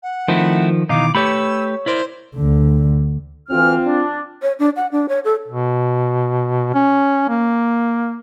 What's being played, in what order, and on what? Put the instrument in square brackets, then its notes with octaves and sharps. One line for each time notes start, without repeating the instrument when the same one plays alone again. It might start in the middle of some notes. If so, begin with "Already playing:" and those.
[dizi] F#5
[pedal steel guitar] D#3 F3 [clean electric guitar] A3 C4 E4
[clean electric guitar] B2 D#3 E3 [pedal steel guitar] D#4 F5 [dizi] D6
[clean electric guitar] A3 G4 B4 [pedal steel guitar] C#5 B5 [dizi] E6
[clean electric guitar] E4 A#4 D5 [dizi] C5
[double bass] D2 D3
[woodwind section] D2 E3 F6 [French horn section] C4 F4
[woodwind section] D4
[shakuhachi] C#5
D4
F#5
D4
C#5
A4
[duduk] B2
C#4
A#3